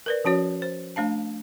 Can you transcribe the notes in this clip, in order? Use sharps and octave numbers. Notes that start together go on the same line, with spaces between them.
A#4 B4 D5
F3 C#4 F#4 C#5
C5
A3 D4 F5 A5